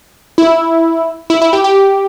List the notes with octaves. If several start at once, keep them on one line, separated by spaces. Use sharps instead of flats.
E4
E4
E4
G4
G4